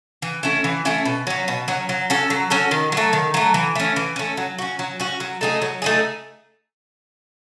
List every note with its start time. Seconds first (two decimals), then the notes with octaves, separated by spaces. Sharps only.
0.22 E3
0.43 A3 C#4 E4
0.64 E3
0.85 A3 C#4 E4
1.05 B2
1.27 F#3 C#4
1.48 B2
1.68 F#3 C#4
1.89 F#3
2.10 C#4 F#4 A4
2.30 F#3
2.50 C#4 F#4 A4
2.71 D#3
2.92 F#3 A3
3.13 D#3
3.34 F#3 A3
3.54 E3
3.75 A3 C#4
3.96 E3
4.16 A3 C#4
4.37 F#3
4.58 C#4 F#4
4.79 F#3
5.00 C#4 F#4
5.20 F#3
5.41 A3 D#4 G#4
5.62 F#3
5.82 A3 D#4 G#4